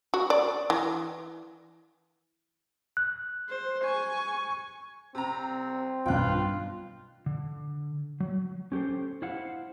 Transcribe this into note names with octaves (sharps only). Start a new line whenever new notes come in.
F#4
D5
E3
F#6
C5
G#5 C#6
C3 C4 A#5
B1 G2 F4 G5 F#6
D3
F#3
C#4 G4 A4 C5
E4 C5 F5 F#5